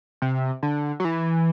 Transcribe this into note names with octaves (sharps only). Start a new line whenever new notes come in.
C3
D3
F#3
E3